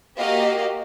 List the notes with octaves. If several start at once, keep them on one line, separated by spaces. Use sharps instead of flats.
A#3 F#4 G4 D#5 F5